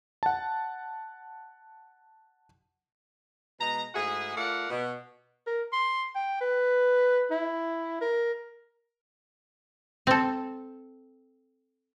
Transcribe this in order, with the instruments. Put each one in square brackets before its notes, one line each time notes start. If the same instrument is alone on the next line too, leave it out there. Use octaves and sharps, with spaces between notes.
[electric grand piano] F#5 A5
[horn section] B2 G#3 D#5 A#5
G#2 A3 E4 F#4 G#4
A3 F4 A#4 D5 F5 F#5
B2
[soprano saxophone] A#4
C6
G5
B4
E4
A#4
[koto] C4 A4